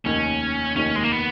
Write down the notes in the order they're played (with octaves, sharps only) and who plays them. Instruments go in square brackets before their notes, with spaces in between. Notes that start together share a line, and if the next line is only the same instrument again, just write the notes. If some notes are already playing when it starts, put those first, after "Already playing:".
[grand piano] F1 D#2 D#3 [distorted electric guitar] C#4
[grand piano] F1 D#2 D#3 [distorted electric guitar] C#4
[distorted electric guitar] G#3
A#3
B3